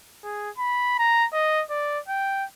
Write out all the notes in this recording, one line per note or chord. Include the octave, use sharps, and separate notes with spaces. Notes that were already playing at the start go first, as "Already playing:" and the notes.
G#4
B5
A#5
D#5
D5
G5